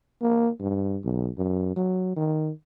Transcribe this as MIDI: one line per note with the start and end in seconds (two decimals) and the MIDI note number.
0.22 0.50 58
0.60 0.99 43
1.04 1.29 35
1.38 1.75 42
1.76 2.15 54
2.16 2.50 51